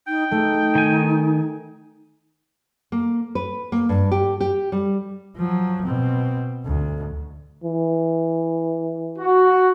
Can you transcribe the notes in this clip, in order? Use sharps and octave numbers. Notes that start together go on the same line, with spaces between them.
D#4 G5
A3 D#4
D#3 G#5
A#3
B4
A#3
G2
G4
G4
G3
F3 F#3
B2 C4
D2
E3
F#4